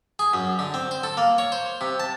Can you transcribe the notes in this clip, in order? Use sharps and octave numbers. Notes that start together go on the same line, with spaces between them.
G#4
F#2
D3
C4
C5
A4
A#3
C#5
C5
C3
A5